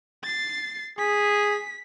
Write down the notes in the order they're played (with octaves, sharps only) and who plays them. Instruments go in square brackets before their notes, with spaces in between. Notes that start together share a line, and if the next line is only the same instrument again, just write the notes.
[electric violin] A6 C7
[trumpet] G#4 [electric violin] B6